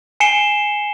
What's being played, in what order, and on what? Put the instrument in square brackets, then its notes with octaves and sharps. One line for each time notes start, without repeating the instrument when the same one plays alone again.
[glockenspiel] G#5 C7 C#7 E7 G7